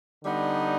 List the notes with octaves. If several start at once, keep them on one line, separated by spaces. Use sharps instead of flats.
D3 G3 B3 D#4